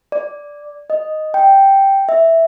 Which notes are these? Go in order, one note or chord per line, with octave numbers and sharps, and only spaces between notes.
D5
D#5
G5
E5